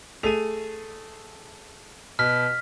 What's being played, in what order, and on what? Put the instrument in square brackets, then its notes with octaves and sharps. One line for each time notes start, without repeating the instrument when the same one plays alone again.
[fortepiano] A3 G#4 [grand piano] D#7 F7
[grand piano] B2 [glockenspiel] F6 B6